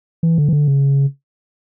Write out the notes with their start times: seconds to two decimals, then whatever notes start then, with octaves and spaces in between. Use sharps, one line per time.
0.23 E3
0.38 D3
0.48 E3
0.53 D3
0.68 C#3